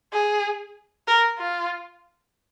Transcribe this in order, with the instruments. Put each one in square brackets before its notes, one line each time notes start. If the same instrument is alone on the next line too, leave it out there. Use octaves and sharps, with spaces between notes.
[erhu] G#4
A#4
F4